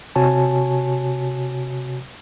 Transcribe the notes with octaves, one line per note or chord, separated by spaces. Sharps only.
C3 F#4 C#5 G#5 A5